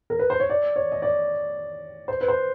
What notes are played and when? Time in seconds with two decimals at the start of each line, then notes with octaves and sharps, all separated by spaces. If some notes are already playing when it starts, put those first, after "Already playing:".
0.10 A#4
0.19 B4
0.30 C5
0.40 C#5
0.50 D5
0.76 C#5
0.92 D#5
1.02 D5
2.08 C5
2.21 B4
2.28 C5